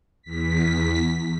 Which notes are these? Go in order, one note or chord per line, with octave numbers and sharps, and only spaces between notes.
E2 B6